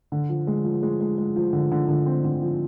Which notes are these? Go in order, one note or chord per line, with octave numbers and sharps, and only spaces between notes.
D3
F3
G#3
F3
G#3
G#3
G#3
F3
D3
D3
D3
C4
D3
F3